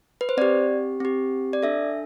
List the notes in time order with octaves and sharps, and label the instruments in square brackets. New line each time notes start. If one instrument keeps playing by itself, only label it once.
[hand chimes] B4
C5
C4 G4 D5
C4 G4
D5
D4 A4 E5